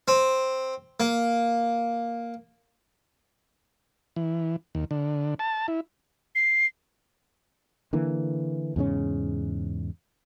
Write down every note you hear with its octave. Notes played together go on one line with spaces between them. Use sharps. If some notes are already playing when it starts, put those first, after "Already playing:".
C4
A#3
E3
D#2
D3
A5
E4
C7
D3 E3 A#3
E2 G#2 C#3 C#4